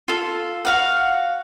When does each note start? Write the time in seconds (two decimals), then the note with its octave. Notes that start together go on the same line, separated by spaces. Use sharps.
0.08 F4 A4
0.65 F#4 F5 F#5